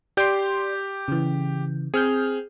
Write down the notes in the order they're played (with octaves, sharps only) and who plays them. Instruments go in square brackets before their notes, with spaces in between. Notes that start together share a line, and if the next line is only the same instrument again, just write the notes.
[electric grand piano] G4 G6 D7 [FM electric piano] D5 C6
[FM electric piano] C#3 E3
[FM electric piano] C4 F6 G6 [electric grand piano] G#4